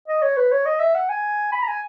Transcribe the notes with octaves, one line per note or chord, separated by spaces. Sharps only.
D#5
C#5
B4
C#5
D#5
E5
F#5
G#5
B5
A#5
G#5